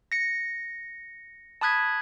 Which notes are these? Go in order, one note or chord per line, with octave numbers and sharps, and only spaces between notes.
A#6 C#7
A5 B5 D#6 F#6 G#6 B6